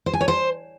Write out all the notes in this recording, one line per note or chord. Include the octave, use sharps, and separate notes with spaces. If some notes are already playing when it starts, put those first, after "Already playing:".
C5
G#5
C#5
C5